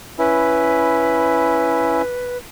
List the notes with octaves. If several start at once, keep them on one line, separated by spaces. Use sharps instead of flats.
C#4 E4 B4